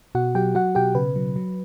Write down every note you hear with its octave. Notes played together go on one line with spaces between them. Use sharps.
B2 F#4 F#5
F#3 G4 G5
F#3 F#4 F#5
B2 G4 G5
C#3 B4
F#3
F#3